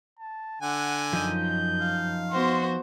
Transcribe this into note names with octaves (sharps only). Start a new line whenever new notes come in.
A5
D3 F#5 G#5
F#2 F3 D#4 D#5 G6
F5
B3 F#4 C5 C6